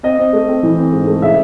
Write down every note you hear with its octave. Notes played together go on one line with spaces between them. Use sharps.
C4 D#5
C4
A3
C4
E3
C4
G#2
A3
C#3 E5